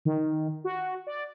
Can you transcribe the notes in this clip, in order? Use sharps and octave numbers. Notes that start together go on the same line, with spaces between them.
D#3
F#4
D5